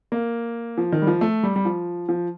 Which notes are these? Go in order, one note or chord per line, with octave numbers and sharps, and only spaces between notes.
A#3
F3
D#3
G3
F3
A3
G3
G3
F3
F3